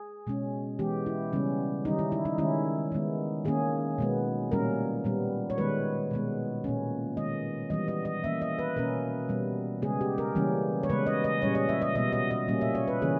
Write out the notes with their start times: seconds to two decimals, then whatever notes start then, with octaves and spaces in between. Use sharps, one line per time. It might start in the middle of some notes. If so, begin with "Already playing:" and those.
Already playing: G#4
0.27 B2 G#3 C#4
0.79 E3 G#3 B3 G4
1.06 E4
1.33 C#3 G3 B3 C#4
1.85 D#3 G3 C#4 D#4
1.99 E4
2.12 E4
2.25 D#4
2.38 D#3 G#3 C#4 E4
2.92 D#3 G#3 B3
3.45 D#3 A#3 C#4 G#4
3.98 B2 G#3 B3
4.52 A#2 G3 A#3 C#4 A#4
5.04 A#2 G3 B3
5.50 C#5
5.58 D#3 G#3 B3 B4
6.11 B2 G#3 B3
6.64 A#2 A#3 C#4
7.17 D#3 G#3 B3 D#5
7.70 E3 G3 B3 D#5
7.88 D#5
8.05 D#5
8.24 E3 A#3 C#4 E5
8.41 D#5
8.59 B4
8.76 B2 A#3 C#4 A#4
9.29 B2 G3 B3
9.82 C#3 G#3 B3 G#4
10.01 G4
10.18 A#4
10.35 C#3 E3 G3 A#3 C#4
10.83 C#5
10.89 C#3 G#3 B3 B4
11.06 D#5
11.24 D#5
11.42 A#2 G3 C#4 C#5
11.55 D#5
11.69 E5
11.82 D#5
11.95 B2 G3 B3 D#5
12.13 D#5
12.31 D#5
12.48 A#2 G3 A#3 C#4
12.61 E5
12.75 C#5
12.88 B4
13.02 C#3 E3 A#3 C#4 G#4